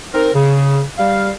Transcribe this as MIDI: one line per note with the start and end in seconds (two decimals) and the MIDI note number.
0.14 0.29 60
0.14 0.29 63
0.14 0.29 70
0.34 0.82 49
0.98 1.31 55
0.98 1.31 77